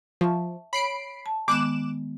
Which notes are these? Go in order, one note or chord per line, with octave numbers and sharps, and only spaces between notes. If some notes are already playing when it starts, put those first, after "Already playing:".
F3 E5 A5 C#6
C#5 B5 C7 D7
A5
D#3 G#3 B3 D6 F#6 E7